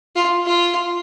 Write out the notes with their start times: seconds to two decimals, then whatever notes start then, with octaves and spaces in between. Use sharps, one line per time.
0.16 F4
0.46 F4